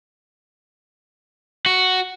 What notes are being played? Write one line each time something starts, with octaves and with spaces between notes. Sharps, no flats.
F#4